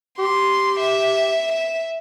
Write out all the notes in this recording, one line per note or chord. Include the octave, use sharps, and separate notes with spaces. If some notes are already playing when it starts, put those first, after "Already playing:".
G4 C6
E5
E5